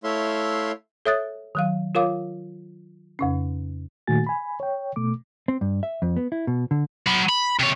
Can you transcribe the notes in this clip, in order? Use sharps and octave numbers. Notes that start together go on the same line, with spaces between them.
A3 E4 C#5 E5 F5 C6
A4 C#5 E5 D#6 F#6 A6
D#3 F#3 F5
F4 A#4 C#5 F5 D6
F2 C#3 C#4
A#2 D#3 A3 F#4 G#5 A6
G#5 B5
C#5 G5
B2 A3 D6
C4
G2
E5
F2
B3
E4
B2
D3
F#3 B5
B5
C3 C#5